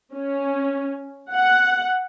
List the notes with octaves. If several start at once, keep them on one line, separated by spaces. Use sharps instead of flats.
C#4
F#5